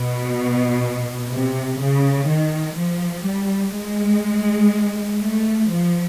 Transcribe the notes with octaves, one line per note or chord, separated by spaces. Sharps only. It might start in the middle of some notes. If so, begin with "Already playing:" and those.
Already playing: B2
C3
C#3
D#3
F3
G3
G#3
A3
F3